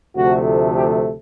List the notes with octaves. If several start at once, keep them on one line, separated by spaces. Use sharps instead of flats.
D2 C3 F3 A3 F#4
G4